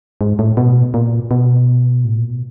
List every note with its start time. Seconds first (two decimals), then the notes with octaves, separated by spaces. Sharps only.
0.21 G#2
0.39 A2
0.57 B2
0.94 A#2
1.31 B2
2.05 A2
2.17 A#2
2.30 B2